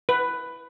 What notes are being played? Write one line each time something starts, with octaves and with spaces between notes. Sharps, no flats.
B4